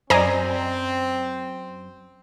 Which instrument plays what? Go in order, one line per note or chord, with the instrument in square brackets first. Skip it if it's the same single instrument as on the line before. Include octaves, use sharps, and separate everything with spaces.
[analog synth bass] F#2 [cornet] C4 [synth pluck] C5 D5 [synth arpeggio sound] D#5 G#5 A#5